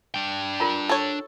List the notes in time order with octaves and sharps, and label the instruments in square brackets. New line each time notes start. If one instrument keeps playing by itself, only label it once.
[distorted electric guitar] D4 G5
[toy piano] F4 A#4 A#5
[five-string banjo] A4 C#5